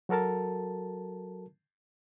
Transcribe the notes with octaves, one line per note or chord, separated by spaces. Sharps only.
F#3 F#4 A4 A#4 A5